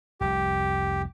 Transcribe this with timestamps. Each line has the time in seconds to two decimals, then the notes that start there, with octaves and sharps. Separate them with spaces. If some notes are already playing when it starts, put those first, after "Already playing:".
0.21 F1 C2 G4